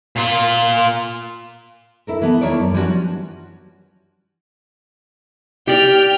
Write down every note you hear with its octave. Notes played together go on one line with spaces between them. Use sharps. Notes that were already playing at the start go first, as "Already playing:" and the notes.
A#2 F4
E4 A4 A#4
E3 B3 A5
D#2 E4 A#4 C#5 D5
F#2
E3 F3 G3 C#4 D4 F#4
G4 D5 G5 F6